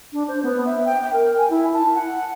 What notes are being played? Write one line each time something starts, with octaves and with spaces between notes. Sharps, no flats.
D4
C5
B3
E5
G5
G5
A#4
G#5
E4
A5
F#5